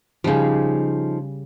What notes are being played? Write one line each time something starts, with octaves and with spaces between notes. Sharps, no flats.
C#3 F3 G3 D#4 G#4